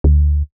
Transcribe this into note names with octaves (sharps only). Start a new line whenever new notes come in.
D2